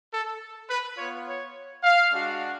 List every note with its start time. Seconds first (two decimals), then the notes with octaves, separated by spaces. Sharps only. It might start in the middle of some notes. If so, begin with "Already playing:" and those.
0.13 A4
0.70 B4
0.97 B3 F4 C#5
1.27 C#5
1.83 F5
2.12 G#3 D4 F#4